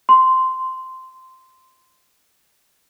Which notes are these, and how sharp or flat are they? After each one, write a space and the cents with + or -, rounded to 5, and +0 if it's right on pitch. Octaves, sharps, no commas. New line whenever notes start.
C6 -10